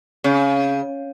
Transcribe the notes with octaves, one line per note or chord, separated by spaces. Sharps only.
C#3